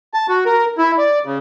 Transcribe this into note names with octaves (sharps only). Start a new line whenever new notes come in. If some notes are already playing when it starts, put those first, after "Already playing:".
A5
F#4
A#4
E4
D5
C#3